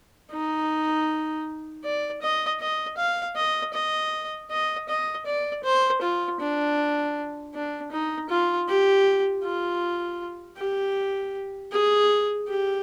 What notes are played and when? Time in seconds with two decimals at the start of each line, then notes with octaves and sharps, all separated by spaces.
0.32 D#4
1.84 D5
2.22 D#5
2.60 D#5
2.97 F5
3.36 D#5
3.74 D#5
4.50 D#5
4.88 D#5
5.26 D5
5.64 C5
6.02 F4
6.40 D4
7.54 D4
7.92 D#4
8.29 F4
8.68 G4
9.44 F4
10.57 G4
11.72 G#4
12.48 G4